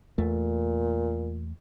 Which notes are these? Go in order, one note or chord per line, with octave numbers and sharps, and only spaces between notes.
E2 A#2 A3